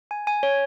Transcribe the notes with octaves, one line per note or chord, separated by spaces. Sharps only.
G#5
G#5
C#5